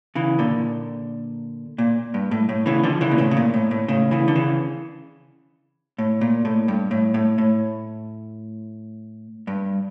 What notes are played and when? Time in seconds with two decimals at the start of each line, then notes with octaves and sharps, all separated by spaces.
0.15 C#3 E3
0.39 A#2 D3
1.78 A#2
2.14 G2
2.31 A2
2.49 A2
2.66 C#3 E3
2.83 D3 F3
3.01 C#3 E3
3.11 A#2
3.18 A2 C#3
3.31 C#3
3.37 A#2
3.54 A2
3.71 A2
3.88 A2 C#3
4.11 C#3 E3
4.28 D3
4.36 C#3 E3
5.98 A2
6.21 A#2
6.45 A2
6.68 G2
6.91 A2
7.14 A2
7.38 A2
9.47 G2